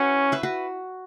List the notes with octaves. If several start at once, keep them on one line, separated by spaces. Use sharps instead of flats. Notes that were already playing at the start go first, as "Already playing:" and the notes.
Already playing: C#4 E4 F#4 B4 C#5 E5 F#5
B4 E5
F#4 B4